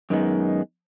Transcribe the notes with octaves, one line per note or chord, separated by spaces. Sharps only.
F#2 D#3 G#3 B3 D#4